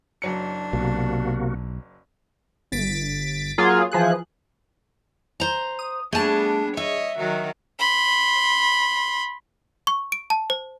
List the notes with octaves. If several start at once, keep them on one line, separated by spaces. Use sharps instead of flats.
F#1 F#3 D4 C#7
B1 C3 A#3 F#4
G1 A6 B6 D7
F#3 A#3 F4 G#4
E3 F3 G#4 F#6
C5 A#5
D#6
G3 A3 B3 D4 G#4 A5
C#5 D#5 E5
D#3 F#3 F#4
B5 C6
C#6
D7
A5
C5